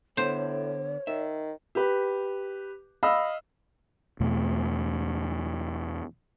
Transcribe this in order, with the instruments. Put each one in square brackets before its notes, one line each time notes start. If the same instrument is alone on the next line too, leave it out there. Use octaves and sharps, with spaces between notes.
[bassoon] A2 [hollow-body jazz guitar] D3 B3 [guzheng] C5 [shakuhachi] C#5
[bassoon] D#3 [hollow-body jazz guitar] E5
[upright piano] G4 B4
D#5 F5 B5 E6
[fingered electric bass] E2 B2 A3